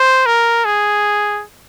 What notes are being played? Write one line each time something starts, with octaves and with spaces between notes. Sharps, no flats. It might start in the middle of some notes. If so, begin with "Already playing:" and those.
Already playing: C5
A#4
G#4